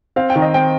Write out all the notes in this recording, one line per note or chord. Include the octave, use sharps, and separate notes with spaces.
C4 F5
G5
D#3
D#5
C4 G5